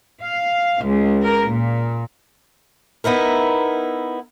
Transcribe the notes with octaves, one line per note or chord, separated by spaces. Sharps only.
F5
C#2
A#4
A#2
B3 D#4 E4 A#4